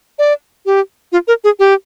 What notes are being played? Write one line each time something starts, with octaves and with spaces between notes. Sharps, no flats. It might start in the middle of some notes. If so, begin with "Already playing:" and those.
D5
G4
F4
A#4
G#4
G4